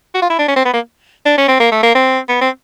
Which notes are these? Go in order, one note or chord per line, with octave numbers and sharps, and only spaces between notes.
F#4
F4
E4
D4
C#4
C4
B3
A#3
D4
C#4
C4
A#3
A3
A#3
C4
B3
C4